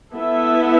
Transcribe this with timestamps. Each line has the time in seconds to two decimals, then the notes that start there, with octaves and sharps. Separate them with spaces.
0.14 B3 E4 A4 E5